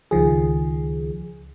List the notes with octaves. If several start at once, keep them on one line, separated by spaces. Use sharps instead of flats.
C#2 D#3 F3 G#4